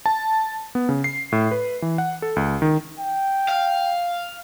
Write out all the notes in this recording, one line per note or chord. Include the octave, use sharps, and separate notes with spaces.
A5
B3
C#3
C7
A2
B4
E3
F#5
A4
C#2
D#3
G5
F5